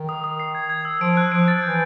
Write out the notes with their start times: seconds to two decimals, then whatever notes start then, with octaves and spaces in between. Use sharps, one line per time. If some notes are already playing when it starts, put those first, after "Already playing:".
Already playing: D#3
0.09 D#6
0.24 D#6
0.40 C7
0.55 G#6
0.70 G#6
0.85 E6
1.01 F3 D7
1.17 F#6
1.32 F3 D7
1.48 A6
1.63 E3 G6